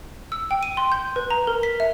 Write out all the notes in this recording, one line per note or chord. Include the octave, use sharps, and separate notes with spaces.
E6
G5
D#7
C6
G6
B4
A#5
A#4
B6
E5